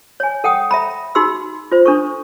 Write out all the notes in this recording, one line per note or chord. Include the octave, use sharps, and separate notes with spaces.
C#5 G#5
A4 F#5 G5 D#6
E5 A#5 B5
D#4 F#4 G#4 B5 C6 E6
F4 C5
D4 A4 C#6